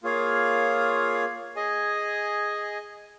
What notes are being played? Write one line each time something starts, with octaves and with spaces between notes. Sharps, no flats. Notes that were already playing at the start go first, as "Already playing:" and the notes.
A#3 F4 G#4 C#5 F5
G#4 D#5 G#5